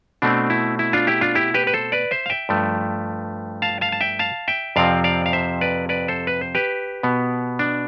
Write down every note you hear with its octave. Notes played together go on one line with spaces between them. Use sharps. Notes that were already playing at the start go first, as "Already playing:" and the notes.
B2 A3 C4 D4
E4
E4
D4 F4
E4 G4
D4 F4
E4 G4
G4 B4
B4
A4 C5
B4 D5
C5 E5
F5
E5 G5
G2 F3 A3
F5 A5
F5 A5
A5
E5 G5
F5 A5
E5 G5
F2 C3 F3 C4 D5 F5
D5 F5
F5
C5 E5
B4 D5
B4 D5
A4 C5
B4
C5
G4 B4
B2 B3
D4